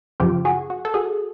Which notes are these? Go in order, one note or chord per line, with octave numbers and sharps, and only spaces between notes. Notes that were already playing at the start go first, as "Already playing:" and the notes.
F#2 C#3 F3 F4 G4
F#4 G#4
F#4
A4
F#4 G#4